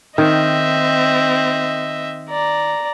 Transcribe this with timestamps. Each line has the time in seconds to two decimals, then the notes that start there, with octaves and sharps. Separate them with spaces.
0.18 D#3 C4 D#5 E5
2.29 D5 A#5